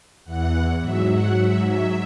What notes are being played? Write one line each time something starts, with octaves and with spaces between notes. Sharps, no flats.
E2 E3 F#5
G#2 F#3 E5
F#5
G#2 F#3 E5
E5